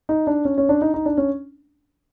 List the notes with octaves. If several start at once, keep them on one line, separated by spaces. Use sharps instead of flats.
D#4
D4
C#4
C#4
D4
D#4
D#4
D4
C#4